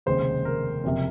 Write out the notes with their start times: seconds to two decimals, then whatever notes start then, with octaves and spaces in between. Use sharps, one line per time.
0.06 F1 D#2 C#3 G#3 C5
0.45 A#4
0.84 F#1 F2 C3